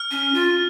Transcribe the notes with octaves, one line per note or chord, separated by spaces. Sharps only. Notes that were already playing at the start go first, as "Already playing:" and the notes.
Already playing: F6
C#4
F4